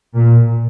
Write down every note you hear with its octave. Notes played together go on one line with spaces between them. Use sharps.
A#2